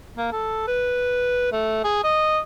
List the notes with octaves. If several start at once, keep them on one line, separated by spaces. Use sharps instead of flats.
A#3
A4
B4
A3
G#4
D#5